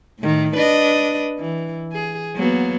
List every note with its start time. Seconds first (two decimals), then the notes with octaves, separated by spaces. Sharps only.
0.19 A2 D#3
0.55 D4 B4 D#5
1.39 E3
1.92 G#4
2.35 F#3 A#3 B3